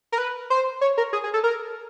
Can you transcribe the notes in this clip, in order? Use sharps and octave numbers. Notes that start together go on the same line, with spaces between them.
A#4
B4
C5
C#5
A#4
G#4
G#4
A4
A#4